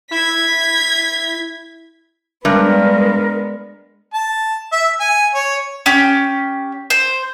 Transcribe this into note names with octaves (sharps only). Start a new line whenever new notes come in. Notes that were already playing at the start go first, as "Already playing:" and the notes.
E4 G#6 B6
G2 G#3 B3 A#4
A5
E5
G#5
C#5
C#4 G4
C5